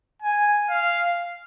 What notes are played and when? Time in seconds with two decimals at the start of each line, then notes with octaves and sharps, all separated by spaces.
0.22 G#5
0.69 F5